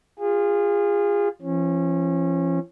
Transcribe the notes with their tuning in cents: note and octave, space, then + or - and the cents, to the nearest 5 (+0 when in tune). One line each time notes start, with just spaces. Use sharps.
F4 +0 G#4 -30
F3 -45 C#4 -25